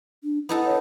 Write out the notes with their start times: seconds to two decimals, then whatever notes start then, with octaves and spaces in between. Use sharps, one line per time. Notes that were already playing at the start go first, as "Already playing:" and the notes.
0.24 D4
0.49 B3 D#4 E4 A4
0.66 C#5